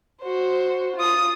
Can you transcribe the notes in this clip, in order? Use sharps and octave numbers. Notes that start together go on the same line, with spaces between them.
F#4 C5
F4 D#6